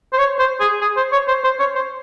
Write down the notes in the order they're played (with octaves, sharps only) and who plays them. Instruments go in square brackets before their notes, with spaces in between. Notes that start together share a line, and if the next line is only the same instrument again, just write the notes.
[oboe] C5
C#5
C5
G#4
G#4
C5
C#5
C5
C5
C#5
C5